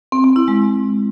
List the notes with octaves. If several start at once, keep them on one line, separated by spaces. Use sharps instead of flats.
C4
C4
E4
G#3